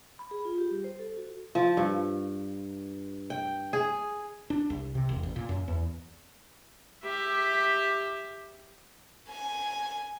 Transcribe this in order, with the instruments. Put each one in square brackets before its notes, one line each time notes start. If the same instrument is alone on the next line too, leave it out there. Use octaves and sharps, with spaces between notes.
[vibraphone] B5
G#4
F4
G4
G3
C5
A4
F#4
[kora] F3
G2
G5
G#4
[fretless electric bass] D4
C2
C3
E1
A1
A#2
F#2
E2
[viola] G4 E5
[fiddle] G#5